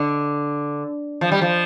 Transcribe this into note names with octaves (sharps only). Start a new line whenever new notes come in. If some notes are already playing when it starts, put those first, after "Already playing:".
Already playing: D3
F3
G3
F3